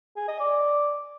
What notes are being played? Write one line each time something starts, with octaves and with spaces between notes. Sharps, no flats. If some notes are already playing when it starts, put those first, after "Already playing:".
G#4
D#5
D5